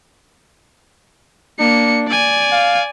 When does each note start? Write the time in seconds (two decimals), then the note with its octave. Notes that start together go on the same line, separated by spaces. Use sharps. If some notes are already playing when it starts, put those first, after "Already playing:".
1.59 A#3 D4 C#7
2.07 D5 G#5
2.52 F5